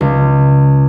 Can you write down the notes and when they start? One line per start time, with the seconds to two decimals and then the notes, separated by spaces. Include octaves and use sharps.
0.01 C#2